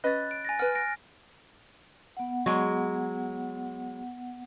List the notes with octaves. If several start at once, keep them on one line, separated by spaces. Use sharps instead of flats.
C#4 B4 D#5 F#6 A6
D7
G#5 A6 A#6
B4 F#5 F6
A#6 D7
B3 F#5
F#3 G#3